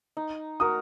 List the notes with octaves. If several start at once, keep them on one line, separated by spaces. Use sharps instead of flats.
D#4
F#4 A#4 D#6